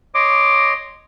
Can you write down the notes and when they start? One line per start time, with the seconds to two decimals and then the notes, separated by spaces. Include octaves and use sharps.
0.15 C#5 D#5 C6 D6